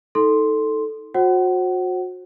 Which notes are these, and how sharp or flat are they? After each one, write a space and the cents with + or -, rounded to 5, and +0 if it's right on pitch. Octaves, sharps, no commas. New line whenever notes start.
D#4 +30 A4 +0 C6 +0
F#4 -30 C5 +35 F#5 +25